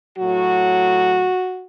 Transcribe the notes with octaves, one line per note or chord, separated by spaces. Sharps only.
A2 F#3 F#4